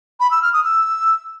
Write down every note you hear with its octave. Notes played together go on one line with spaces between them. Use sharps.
B5
E6
F6
D#6
E6